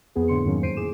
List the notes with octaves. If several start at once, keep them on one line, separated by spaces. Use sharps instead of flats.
F2 B3 G#4
A2 D3 C6 C#7
F2 G#2 D#3 F#3 A#3 C#4
E2 C5 C7 D7 D#7
A2 G#4 D6 E7